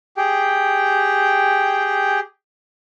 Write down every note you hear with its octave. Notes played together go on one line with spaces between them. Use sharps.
G4 G#4 G5